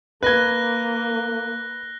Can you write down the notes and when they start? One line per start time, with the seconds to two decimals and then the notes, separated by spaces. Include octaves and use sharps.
0.23 A#3 B4 F#6 G#6 A#6 G7